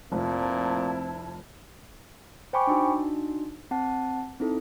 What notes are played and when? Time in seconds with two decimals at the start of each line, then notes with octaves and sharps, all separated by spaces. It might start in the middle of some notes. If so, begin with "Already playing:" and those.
0.12 F1 A#2 F3 C4 E4 A5
2.53 C5 G5 G#5 B5 C#6 D6
2.67 D4 D#4 F#4
3.71 C4 F#5 A5
4.40 C4 D#4 E4 A4